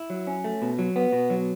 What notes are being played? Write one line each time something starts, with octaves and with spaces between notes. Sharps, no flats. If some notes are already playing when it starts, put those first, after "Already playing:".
Already playing: E4
F#3
C#4
A3
B2
F#3
B3
B2
F#3